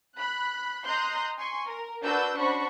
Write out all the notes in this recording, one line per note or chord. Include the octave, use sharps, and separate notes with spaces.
B5 F#6
D#5 A#5 C6 F#6 G6
G#5 C6 C#6
A#4
D4 F#4 B4 E6 G6
C#4 D4 F#4 C5 B5 C#6